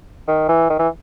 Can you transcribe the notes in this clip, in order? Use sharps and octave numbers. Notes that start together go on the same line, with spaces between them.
D#3
E3
D#3
E3